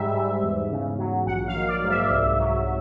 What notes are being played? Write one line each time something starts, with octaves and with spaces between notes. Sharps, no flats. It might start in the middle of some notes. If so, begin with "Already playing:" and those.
Already playing: G#2 G3 E5
G#2
E2
C#3
F#3
A#1 F#5
F5
D#3
D5
G#2
E5
C2
F#3